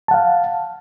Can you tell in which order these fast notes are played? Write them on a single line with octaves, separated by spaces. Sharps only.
A5 F#5 F5